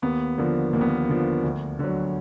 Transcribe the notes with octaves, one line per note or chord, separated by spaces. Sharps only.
D#2 B3
D3 F3 A#3
D#2 A#3
B3
A#3
D3 F3
D2
D3 F#3